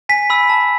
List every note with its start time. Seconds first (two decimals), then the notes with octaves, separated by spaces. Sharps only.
0.09 G#5 B6
0.30 B5 E6
0.49 A5